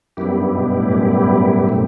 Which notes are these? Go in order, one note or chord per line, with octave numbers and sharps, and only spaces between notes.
F#2 G3 B3 E4 G4
G2
B2
A2
F#2
F#2
B2 A3 C4 G4